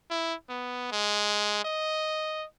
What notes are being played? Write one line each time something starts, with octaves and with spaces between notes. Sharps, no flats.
E4
B3
G#3
D#5